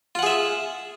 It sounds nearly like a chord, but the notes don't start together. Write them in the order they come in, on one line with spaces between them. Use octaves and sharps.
F4 F#5 G#4 E5